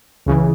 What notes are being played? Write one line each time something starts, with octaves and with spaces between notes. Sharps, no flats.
C#2 C#3 E3